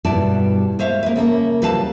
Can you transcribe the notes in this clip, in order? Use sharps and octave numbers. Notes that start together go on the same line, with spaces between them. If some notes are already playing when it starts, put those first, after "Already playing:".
G2 B2 G3 E4 D5 A5
G#3 C5 C#5 E5 F5
A#3 B4
C#3 A3 A#3
D2 G3 B4 F5 A5